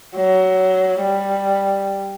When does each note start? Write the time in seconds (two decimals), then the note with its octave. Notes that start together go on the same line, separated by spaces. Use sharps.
0.16 F#3
1.01 G3